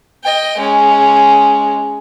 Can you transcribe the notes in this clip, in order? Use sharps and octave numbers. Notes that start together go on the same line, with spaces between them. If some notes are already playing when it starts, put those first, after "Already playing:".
D#5 G5
G#3 C#4